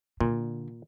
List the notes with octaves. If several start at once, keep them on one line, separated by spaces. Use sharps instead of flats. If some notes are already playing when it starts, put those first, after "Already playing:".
A#2 D3